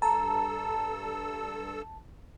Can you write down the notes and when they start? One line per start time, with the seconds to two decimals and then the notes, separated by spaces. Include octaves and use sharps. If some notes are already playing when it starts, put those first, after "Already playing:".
0.02 G2 A4 A5 A#5 E6